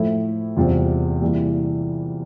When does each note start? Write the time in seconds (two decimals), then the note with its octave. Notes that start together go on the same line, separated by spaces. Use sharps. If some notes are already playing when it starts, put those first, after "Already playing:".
Already playing: A2 F3 A3 E4
0.57 E2 C3 G3 C4 F4
1.21 C3 E3 G3 A#3